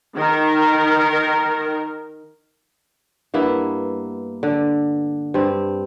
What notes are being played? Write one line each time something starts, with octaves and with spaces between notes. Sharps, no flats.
D#3 A#4
G2 A#3 B3 E4
D3
G2 C4